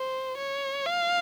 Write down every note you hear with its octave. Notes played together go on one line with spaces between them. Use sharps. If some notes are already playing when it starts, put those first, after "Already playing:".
Already playing: C5
C#5
F5